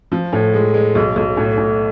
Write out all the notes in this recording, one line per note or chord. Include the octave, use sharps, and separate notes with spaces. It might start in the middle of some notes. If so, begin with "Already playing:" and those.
F3
A2
G#3
G#3
B1
B1
A2
A2